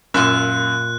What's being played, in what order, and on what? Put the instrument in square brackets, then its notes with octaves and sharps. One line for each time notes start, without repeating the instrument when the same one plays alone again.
[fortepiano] F#2 [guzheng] A#2 F4 E5 [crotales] F#6